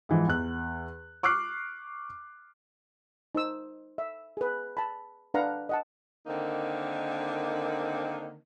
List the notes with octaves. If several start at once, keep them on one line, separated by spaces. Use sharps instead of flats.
G#2 E3 F3
E2 F#6
C#6 D6 F6 F#6 C7
D#4 C5 E6
E5
G#4 B4
A5 B5
D4 B4 F5 F#5 A#5
D#5 F#5 A5
D3 D#3 A#3 C4 D#4